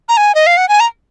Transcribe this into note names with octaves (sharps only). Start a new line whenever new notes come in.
A#5
G#5
D#5
F5
F#5
G#5
A#5